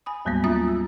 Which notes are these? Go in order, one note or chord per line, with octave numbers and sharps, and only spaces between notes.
G#5 B5 D#6
D2 G#2 F#3 G3 A#3 B3
C#4 F4 E5 A#5 D#6 A6
E6